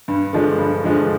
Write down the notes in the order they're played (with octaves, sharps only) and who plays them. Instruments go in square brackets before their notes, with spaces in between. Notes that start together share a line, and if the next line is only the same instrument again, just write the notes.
[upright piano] G2
D3 F3 G#3 D4
G2
D3 F3 G#3 D4